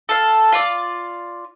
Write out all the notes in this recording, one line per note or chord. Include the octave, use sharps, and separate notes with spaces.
A4 F5
F4 D5